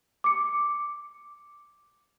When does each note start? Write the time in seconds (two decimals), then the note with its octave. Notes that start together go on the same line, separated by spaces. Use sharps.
0.24 D6 C#7